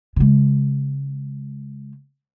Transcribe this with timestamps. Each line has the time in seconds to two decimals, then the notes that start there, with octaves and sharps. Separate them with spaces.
0.16 C#3 G#3